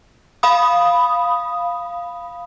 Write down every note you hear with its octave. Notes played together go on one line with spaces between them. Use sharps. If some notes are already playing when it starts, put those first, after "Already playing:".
F5 B5 D#6